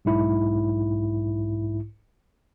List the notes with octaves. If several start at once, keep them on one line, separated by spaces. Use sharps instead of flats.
B1 G#2 E4